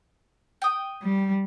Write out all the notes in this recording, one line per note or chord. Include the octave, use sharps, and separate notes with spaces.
G5 D#6
G3